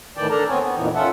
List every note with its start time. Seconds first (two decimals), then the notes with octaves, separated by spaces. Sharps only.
0.17 A2 D#3 E3 D5 G5 A5
0.30 D4 A4 A#4 A5 A#5
0.49 D#2 B3 C4 C#5 G#5
0.62 B3
0.76 F2 A#2 D#3 E3
0.95 C#4 F4 A4 E5 F#5